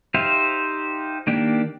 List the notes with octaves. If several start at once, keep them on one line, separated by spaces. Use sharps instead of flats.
D#4 G4 C5 E5 F5
D#3 A#3 D4 G4